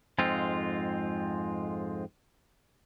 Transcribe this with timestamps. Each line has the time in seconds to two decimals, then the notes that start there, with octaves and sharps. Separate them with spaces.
0.19 F2 G#2 G#3 C4 F4